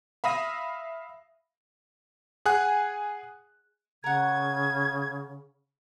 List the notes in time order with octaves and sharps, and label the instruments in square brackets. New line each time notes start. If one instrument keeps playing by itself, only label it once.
[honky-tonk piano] E5 F5 B5 D#6 A#6 D#7
[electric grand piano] G#4 F#5 G#5 F#6
[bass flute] C#3 [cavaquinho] A#4 F#5 [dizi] G#6